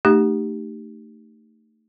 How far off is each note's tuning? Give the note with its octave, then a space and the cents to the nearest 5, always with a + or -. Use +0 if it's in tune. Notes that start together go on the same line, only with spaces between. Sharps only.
A3 +20 D#4 -35 G4 +0